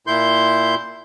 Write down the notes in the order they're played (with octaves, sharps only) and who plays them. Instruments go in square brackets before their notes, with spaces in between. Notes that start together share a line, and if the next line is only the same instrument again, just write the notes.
[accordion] A#2 E4 C6 G6